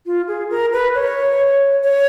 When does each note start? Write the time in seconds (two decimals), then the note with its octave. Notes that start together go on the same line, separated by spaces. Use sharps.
0.06 F4
0.28 G#4
0.50 A#4
0.73 B4
0.95 C#5
1.84 C#5